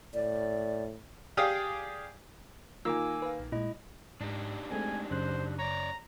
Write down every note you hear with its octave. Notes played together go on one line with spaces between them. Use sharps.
A2 D5
G4 G#4 D5 F5 D#6
D#3 A#3 F4 G#5 D6 E6
B4 F5
A#1
A#2 G#3 E4 D#5
G#2 D4 D#4 G4
G#3 A3 C4 G#5
F#2 C#3 C5 F#6
C#5 D5 A#5